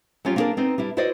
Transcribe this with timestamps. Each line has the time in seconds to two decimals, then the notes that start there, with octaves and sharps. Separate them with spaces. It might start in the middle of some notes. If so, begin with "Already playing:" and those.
0.25 F#3 G3 C#4 F4 G4
0.36 A#3 B3 D4 F#4 G#4 A#4
0.57 B3 C4 D#4
0.78 G3 D4 E4
0.97 E4 F#4 B4 C5 D5 D#5